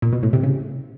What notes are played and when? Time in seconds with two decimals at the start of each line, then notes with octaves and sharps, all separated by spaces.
0.02 A#2
0.13 B2
0.23 A2
0.33 C3
0.43 C#3